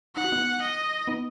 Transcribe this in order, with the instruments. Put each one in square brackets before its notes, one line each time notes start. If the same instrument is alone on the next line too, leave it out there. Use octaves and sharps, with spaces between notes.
[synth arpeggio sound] D#4 [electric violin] F#5
[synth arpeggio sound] F#4
B3 D#4
[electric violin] D#5
[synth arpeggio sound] B3 D#4